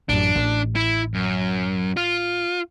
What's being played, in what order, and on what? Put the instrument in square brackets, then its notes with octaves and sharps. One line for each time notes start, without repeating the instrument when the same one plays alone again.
[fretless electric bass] A1 F#2 [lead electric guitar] D4
[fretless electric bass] A1
[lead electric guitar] E4
F#2
F4